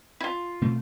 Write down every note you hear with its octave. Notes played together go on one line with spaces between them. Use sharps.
E4 F4
B2 A3 C4